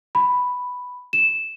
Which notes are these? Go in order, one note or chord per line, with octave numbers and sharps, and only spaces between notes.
B5
E7